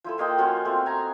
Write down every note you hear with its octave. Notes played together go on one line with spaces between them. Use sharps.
F3 E4 A4
F3 A#3 D#5 G5
C#4 F4 F#4 F#5
A3 C4
G#5 A#5